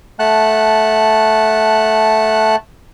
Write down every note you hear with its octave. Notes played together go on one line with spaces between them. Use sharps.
A3 F#5 A5 F#6